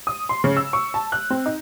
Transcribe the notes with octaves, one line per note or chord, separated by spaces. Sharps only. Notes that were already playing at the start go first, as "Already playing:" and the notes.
D#6
C6
C#3
E6
C#6
A5
F#6
C4
D#4